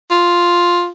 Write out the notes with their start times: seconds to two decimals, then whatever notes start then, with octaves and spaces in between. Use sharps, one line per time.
0.11 F4